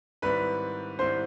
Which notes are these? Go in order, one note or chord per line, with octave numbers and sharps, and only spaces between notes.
G#2 D#3 G3 C4 E4 B4 B5
G#2 D#3 G3 C4 E4 C5 C6